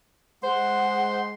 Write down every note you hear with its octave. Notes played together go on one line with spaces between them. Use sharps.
G#3 C5 F#5 C6